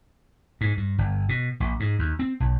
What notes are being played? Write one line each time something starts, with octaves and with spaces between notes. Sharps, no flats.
G#2
G2
G1
B2
A#1
G#2
D#2
C4
B1